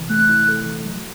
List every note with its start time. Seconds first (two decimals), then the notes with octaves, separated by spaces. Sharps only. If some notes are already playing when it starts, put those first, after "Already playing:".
Already playing: C3 E3
0.10 A3 F#6
0.29 E4
0.48 A4
0.66 E3
0.85 F#3